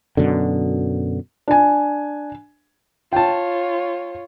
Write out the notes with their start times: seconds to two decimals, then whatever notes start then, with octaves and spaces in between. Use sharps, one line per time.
0.17 F#2 B2 D3
1.48 D4 G#5
3.13 F4 C#5 G5 A5